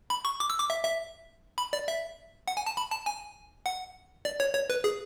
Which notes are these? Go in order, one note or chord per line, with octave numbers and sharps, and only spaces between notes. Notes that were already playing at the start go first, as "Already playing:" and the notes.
B5
C#6
D6
E6
D6
E5
E5
B5
D5
E5
F#5
G#5
A5
B5
A5
G#5
F#5
D5
C#5
C#5
B4
G#4